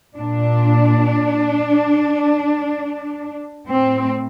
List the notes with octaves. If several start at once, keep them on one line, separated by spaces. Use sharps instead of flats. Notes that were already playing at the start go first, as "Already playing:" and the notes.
A#2 D4
A2 C4